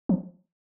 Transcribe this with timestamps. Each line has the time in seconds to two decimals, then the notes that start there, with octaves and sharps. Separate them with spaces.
0.09 F3